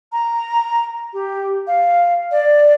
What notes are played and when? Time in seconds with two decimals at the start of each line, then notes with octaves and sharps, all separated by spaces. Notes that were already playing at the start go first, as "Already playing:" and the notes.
0.12 A#5
1.13 G4
1.67 F5
2.31 D5